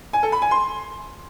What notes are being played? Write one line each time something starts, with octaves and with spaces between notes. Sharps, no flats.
G#5
A4
B5
G#5
C6